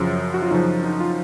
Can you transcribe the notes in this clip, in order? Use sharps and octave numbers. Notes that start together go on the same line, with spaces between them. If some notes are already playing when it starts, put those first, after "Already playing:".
Already playing: F#2 C#3 F3
F#4
F4
F#2 C#3 F3 D#4
D#4
F4